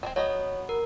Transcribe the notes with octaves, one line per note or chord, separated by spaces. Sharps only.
G3 G#3 C4
F#3 B3 C#5 D#5
A#4